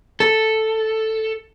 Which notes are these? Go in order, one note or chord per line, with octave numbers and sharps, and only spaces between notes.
A4